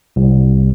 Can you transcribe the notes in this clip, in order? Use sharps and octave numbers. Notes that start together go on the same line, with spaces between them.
C2